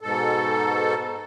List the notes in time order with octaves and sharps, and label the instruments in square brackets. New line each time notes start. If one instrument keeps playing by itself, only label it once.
[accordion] G#2 B2 A4